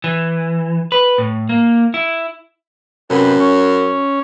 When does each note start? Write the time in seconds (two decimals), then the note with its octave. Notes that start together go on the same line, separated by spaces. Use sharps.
0.04 E3
0.92 B4
1.18 A2
1.49 A#3
1.94 E4
3.10 F#2 C3 B3
3.40 C#4